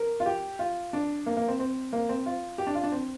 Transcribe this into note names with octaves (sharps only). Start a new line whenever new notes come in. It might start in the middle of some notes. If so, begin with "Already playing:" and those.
Already playing: A#4
F4
G4
F4
D4
A#3
A#3
C4
C4
A#3
C4
F4
G4
D4
F4
D4
C4